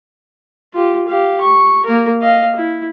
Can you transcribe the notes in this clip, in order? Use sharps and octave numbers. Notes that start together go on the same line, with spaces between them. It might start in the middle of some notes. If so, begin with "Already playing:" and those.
F4 G4
G4 F5
C#6
A#3 A#4
D#5 F5
E4